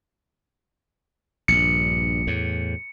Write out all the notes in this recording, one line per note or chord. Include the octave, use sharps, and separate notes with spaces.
A#1 G2 C#7
E2 A2